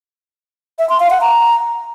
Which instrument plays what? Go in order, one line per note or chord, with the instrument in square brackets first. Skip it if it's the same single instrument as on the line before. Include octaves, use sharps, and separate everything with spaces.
[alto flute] E5
C6
F5
F#5
A#5